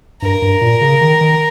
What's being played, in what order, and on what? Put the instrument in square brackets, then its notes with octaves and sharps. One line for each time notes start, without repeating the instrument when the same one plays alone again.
[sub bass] G2 [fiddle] A#4
[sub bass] G2
A#2
C#3
D#3
D#3